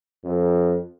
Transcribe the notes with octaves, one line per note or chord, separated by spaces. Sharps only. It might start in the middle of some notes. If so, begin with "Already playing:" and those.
F2